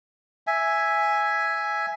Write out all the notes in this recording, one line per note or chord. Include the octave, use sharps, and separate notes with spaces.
E5 G#5